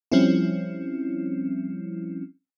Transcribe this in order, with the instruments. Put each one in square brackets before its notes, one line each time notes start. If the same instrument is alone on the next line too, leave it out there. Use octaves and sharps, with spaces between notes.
[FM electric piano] F3 G3 C4 C#4 E4